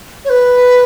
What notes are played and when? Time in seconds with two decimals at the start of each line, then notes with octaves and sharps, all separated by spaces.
0.25 C#5
0.29 B4